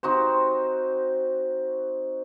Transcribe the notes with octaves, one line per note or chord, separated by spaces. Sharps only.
C4 D#4 F#4 C5